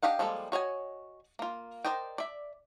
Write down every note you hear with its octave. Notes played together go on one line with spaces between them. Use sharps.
D4 G4 D#5 F5 F#5
F3 G3 G#3 A#3 A4
F#4 C#5 D#5 G#5
A#3 F4
A#4 C5 D5 D#5 G5
D5 E5